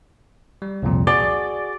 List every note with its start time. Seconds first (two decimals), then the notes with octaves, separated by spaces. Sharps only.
0.62 G3
0.83 C2 F2 A#2
1.07 F#4 G#4 D5